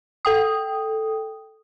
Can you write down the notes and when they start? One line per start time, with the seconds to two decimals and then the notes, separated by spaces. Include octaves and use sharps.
0.25 A4 G5 D#6